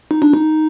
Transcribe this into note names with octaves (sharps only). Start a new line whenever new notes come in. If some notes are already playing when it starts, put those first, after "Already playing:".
D#4
D4
D#4